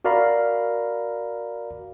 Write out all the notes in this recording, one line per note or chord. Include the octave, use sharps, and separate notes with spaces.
F#4 A#4 D5 F5 A#5 B5